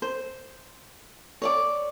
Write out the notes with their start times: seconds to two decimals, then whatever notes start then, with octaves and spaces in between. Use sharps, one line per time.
0.02 C5
1.42 C#5 D5 D6